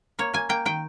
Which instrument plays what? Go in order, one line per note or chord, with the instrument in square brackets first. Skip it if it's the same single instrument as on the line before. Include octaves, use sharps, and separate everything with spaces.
[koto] A#3 C#5
A#3 G#5
A#3 G5
D#3 G5